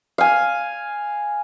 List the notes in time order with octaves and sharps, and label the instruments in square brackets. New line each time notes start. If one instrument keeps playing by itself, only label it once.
[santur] F5 G#5